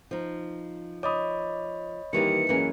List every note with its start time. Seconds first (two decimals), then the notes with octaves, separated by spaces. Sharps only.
0.11 F3 D#4
1.03 C#5 D#5 B5 D6 D#6
2.13 D#3 E3 G3 A#3 G4 C#7
2.49 F#2 E3 F#3 G#3 A#3 C#4